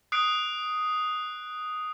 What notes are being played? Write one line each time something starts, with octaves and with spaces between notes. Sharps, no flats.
D#6 F#6 C7 D7